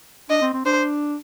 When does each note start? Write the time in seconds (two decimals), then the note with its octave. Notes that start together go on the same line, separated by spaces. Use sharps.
0.30 D4 D#5
0.42 C4
0.54 C4
0.66 D4 C5